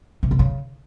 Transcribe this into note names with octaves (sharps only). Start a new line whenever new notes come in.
C3
B2
C#3